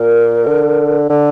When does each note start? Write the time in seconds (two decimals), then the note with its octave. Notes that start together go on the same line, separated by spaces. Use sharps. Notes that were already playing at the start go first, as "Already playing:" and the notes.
Already playing: A#2 A#4
0.47 D3
1.09 D3 A4